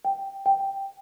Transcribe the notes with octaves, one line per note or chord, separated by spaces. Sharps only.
G5
G5